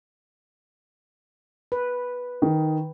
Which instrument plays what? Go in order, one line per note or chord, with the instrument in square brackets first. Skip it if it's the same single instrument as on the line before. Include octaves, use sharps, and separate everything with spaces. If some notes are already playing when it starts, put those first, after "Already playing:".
[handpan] B4
[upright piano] D#3